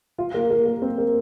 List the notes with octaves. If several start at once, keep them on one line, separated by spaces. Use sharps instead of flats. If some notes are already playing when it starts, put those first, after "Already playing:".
F4
A#3
A#3
A#3
C4
A#3